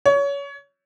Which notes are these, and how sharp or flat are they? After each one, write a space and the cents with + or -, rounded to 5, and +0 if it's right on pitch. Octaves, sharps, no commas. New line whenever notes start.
C#5 +25